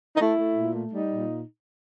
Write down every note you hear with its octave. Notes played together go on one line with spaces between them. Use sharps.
D#4
A3 E4
A3
A#2
A3
G3 D#4
A#2